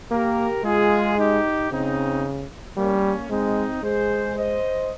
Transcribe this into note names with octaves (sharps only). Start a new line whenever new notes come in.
A#3 G4 A#4
G#3 F4 G#4
D#4 G4
C#3 C4 D#4
G3 A#3 C#4
G#3 C4 D#4
G#3 G#4 C5
C5 D#5